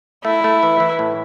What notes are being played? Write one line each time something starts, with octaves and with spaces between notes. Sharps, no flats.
A3 E4
A3
E3
E3
A2